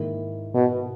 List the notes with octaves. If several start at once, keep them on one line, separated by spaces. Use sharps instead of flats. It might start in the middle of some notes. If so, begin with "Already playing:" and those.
Already playing: G#2 D#3 A#3 E4 A#4
B2